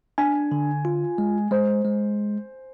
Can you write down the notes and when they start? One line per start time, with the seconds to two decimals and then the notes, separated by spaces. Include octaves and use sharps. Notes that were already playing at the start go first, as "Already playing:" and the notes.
0.18 D4 G#5
0.52 D3
0.85 F4
1.18 G#3
1.51 G#3 C5
1.85 G#3